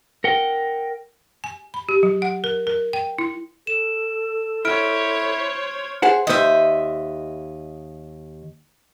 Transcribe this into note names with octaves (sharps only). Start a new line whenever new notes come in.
A#4 F#5 G5
G#5
B5
G4
F#3
F#5
A#4
A#4
G5
E4
A4 E7
E4 C5 C#5 F6 D7
G#4 C5 F#5
D#2 C5 D#5 E5